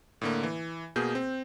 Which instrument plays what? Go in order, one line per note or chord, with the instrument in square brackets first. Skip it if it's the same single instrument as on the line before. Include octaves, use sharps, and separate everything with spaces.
[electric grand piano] A2 D3 A#3
E3
B2 A#3 G#4 G6
C4